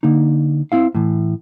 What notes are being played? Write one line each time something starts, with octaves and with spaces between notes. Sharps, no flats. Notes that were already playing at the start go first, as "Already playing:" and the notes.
D3 A#3 D#4
C4 E4 F5
A2 E3